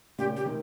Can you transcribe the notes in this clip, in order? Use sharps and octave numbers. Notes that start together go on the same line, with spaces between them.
A#2 C#3 G4
G4
C3 D#3